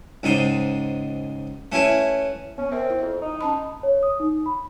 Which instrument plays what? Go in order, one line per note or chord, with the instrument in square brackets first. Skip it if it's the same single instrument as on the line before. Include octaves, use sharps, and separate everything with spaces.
[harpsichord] C#2 G#2 D#4 C5
A3 C#4 E4 B4
[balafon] B3 [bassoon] C#4
[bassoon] C4 [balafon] A#4 C5 E5
[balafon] E4
[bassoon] F2
D#4
[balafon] C#4 A5 B5
[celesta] C#5
D#6
D#4
B5